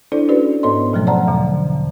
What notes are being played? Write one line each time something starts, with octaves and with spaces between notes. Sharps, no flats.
D4 E4 A4 C5 D5
C#4 F#4 A4 B4 C5 D5
G#2 B3 A4 C#5 D#5 C6
B2 F3 F#3 A3 B3
C5 D5 F#5 A5 A#5
E2 B2 D3